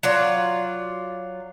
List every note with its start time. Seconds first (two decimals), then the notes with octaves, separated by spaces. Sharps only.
0.03 F#3 F4 D5